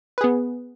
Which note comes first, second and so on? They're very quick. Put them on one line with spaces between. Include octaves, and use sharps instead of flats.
B4 G#4 B3